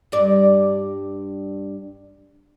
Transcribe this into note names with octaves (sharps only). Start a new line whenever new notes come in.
G2 G3 D5